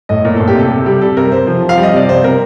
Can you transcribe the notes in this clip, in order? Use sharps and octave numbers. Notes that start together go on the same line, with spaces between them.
A2 D#5
A#2 A#4
A#2 A4
G4
C3 A4
C3
G3 G4
G3 A4
C3 A#4
C3 C5
F3
F3
F5
G3
D#5
C3 D5
C3 C5
C3 A#4